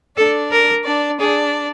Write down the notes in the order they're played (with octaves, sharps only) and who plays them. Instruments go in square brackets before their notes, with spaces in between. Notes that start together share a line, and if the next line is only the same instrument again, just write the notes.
[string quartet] D4 D5 [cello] A4
[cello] A#4
[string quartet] D4 D5
[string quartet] D4 D5 [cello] G#4